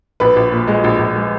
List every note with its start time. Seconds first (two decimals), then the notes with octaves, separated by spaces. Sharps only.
0.20 A#1 B4
0.36 A#1
0.52 A#2
0.67 G#3
0.84 A#1
0.99 A#1
1.15 G#3